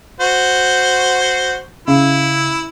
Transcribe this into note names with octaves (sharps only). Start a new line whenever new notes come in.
F#4 C5
C#3 E4